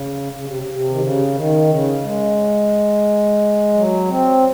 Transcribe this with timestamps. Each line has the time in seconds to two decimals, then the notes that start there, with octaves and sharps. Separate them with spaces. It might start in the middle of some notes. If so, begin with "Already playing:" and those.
Already playing: C#3
0.32 C#3
0.45 C3
0.72 C3
0.90 D#3
1.00 C#3
1.34 D#3
1.69 C#3
2.03 G#3
3.74 F#3
4.09 C4